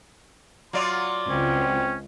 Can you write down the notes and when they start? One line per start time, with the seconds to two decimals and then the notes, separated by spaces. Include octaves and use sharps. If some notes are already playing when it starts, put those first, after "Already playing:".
0.73 F#3 F4 D5 C6
1.29 C#2 C4 C#4